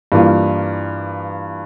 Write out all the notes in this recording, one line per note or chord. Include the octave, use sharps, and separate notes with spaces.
G2 E3 A#3 F4